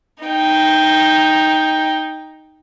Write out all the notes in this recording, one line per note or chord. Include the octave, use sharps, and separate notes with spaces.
D#4 G5